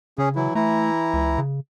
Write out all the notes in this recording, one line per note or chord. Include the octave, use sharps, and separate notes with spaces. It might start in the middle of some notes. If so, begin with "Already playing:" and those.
C#3 C#4 G#4
E3 F#3 E4
E3 A3 E4 A#5
C#2
C#3